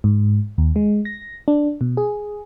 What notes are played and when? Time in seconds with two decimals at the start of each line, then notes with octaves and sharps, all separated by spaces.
0.04 G#2
0.58 D#2
0.76 G#3
1.05 A#6
1.48 D4
1.81 B2
1.97 G#4